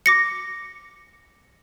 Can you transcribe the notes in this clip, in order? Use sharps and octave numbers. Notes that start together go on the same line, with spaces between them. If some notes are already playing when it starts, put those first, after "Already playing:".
D6 A#6 C#7